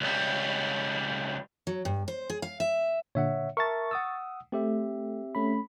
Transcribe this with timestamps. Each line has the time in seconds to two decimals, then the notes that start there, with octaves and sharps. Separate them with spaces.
0.01 C#2 G3
1.67 F#3
1.85 G2
2.08 C5
2.30 G#4
2.42 F5
2.60 E5
3.15 A#2 D3 C#5 E5 F#5
3.57 A#4 E5 A5 C#6 A6
3.91 F#5 D#6 E6
4.52 A3 C4 G4 E5
5.35 A3 C#4 B5